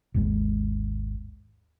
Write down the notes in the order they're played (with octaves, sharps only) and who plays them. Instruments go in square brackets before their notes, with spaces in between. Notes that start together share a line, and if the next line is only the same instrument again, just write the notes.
[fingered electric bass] G#1 D#2 G#3